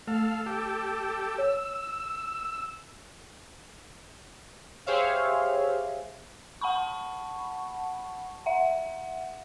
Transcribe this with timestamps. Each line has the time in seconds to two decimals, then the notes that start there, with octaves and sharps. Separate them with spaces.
0.07 A3 A4 F5
0.46 G4 A4
1.38 C#5 E6
4.86 G4 G#4 C5 C#5 E5 F5
6.61 F#5 A5 B5 C#6
8.46 E5 F#5